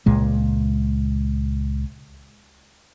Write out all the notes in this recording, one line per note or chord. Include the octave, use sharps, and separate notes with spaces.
C#2 A#2 G#3